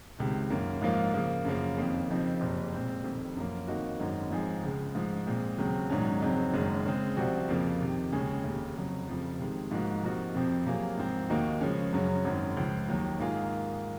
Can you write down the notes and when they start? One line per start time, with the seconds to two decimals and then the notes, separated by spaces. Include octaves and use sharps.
0.19 C#2 C3 D#3
0.50 F#2 D#3 A#3
0.81 G#2 F3 A#3 F4
1.14 C#3 F3 A#3
1.45 F#2 C#3 F3 A#3
1.78 F2 D#3 A#3
2.09 F2 C#3 F3 C4 D#4
2.41 F#1 F2 C3
2.73 A#2 G#3 C4
3.04 F1 F2 D#3
3.36 F#2 F3 A#3
3.68 F2 D#3 A#3 D#4 F#4
3.99 G#1 F#2 D#3 G#3 D#4
4.31 G#2 F3 C4 D#4 G#4
4.63 C#2 C#3 G#3
4.95 G#2 F3 G#3
5.27 A#2 G#3 C4
5.58 D#2 C#3 F#3 C4
5.90 A#1 G#2 D#3 F#3 C#4
6.22 F2 C#3 F#3 C4 D#4
6.53 F#1 F#2 D#3 G#3
6.86 C#3 G#3 C4
7.17 C2 C3 F3 C4 F#4
7.49 F2 C#3 F3 A#3 F4
7.80 F2 C3 D#3
8.12 D#2 C#3 G#3 C#4 G#4
8.44 F1 D#2 C#3
8.76 F2 C#3 F#3
9.08 F1 F2 C#3 F3
9.39 C3 D#3 G#3
9.71 G#2 F3 A#3 D#4 F#4
10.03 C3 F3 A#3 D#4 F#4
10.34 F2 C3 F3 C4
10.66 C3 F#3 A#3 F4 G#4
10.97 G#2 F3 C4
11.30 D#2 D#3 A#3 D#4 F#4
11.61 C#3 F3 G#3 C#4
11.93 F#2 C#3 F#3 C#4
12.25 G#1 F#2 D#3
12.57 C#2 C#3 F3
12.88 D#2 D#3 F#3
13.19 G#2 D#3 A#3 F4 G#4